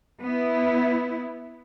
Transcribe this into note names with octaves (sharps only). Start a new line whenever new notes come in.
B3 E4